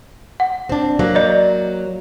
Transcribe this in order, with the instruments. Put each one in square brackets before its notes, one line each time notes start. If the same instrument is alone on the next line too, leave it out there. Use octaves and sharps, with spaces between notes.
[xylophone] F#5
[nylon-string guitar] C4 D4
F#3 A#3
[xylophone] D5 D#5